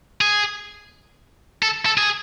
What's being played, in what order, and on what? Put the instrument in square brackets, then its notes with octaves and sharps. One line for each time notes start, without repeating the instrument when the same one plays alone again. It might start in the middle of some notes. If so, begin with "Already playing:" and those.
[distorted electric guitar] G#4
A4
A4
G#4